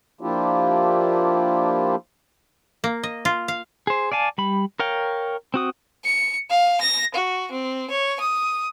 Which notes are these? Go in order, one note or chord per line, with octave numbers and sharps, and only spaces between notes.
F3 A#3 D4 E4 F4 G4
A#3
D#5
F4
F5
G#4 C5
D5 F5 G#5 A5
G3 B5
A#4 C#5 F5 G5
C4 F#4 D#6
C#7
F5
A#6
F#4
C4
C#5
D#6